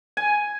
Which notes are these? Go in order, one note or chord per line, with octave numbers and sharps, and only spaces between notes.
G#5